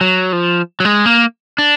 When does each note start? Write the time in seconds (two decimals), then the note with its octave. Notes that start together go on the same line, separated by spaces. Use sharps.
0.01 F#3
0.33 F3
0.80 F#3
0.85 G#3
1.06 A#3
1.58 D4